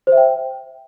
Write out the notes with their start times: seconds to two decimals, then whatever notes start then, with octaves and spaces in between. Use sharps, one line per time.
0.07 C5
0.12 E5
0.17 G5